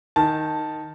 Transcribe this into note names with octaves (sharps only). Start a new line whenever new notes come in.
D#3 A5